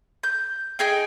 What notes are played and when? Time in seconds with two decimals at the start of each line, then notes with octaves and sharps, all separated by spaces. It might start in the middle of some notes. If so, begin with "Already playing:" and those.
0.23 G6
0.79 D#4 G#4 G5